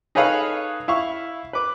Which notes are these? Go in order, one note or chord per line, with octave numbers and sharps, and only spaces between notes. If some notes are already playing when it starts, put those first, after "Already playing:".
D#4 G#4 A4 B4 C#5 F5
E4 F5 C#6
B4 D6